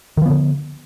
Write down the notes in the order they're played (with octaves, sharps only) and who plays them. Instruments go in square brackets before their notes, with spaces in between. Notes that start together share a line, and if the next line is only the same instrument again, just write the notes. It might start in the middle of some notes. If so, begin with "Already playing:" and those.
[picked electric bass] D#3
F3
B3
D3